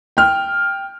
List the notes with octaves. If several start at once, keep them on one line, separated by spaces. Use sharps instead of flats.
G5 F6